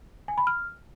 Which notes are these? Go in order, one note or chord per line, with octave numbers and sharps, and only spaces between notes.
G#5
B5
F6